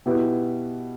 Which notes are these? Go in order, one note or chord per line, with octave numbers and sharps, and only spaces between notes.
B2 B3 E4 G4 B4